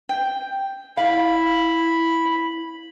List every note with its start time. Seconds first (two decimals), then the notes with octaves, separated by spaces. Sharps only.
0.09 G5
0.97 E4 F5 B5